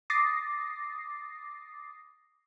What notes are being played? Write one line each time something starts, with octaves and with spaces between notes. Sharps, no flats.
D6 D#6 A6 A#6 C7